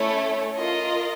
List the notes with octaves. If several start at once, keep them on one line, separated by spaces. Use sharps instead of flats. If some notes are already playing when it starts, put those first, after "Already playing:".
Already playing: A3 C#4 E4 A4 C#5
F4 A#4 D#5